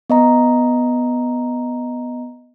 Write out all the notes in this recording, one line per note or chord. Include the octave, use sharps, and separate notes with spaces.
B3 D#5 A#5